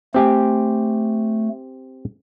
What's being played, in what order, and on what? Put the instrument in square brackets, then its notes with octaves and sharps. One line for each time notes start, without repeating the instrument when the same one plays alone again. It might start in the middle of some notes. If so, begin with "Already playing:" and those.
[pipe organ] A3 [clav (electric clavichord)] C4 G4 G#5